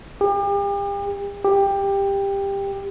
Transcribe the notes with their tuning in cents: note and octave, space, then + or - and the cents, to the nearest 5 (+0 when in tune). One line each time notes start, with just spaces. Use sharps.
G4 +40
G4 +15